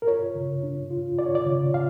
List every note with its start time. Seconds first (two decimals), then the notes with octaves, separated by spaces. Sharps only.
0.02 A#4
0.08 F4 C#5
0.35 C#3
0.63 D4
0.91 F4
1.19 F4 D5
1.26 C#5
1.35 D5
1.46 C#3
1.74 F4 F5